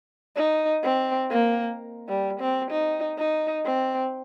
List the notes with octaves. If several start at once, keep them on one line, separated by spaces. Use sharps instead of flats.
D#4
C4
A#3
G3
C4
D#4
D#4
C4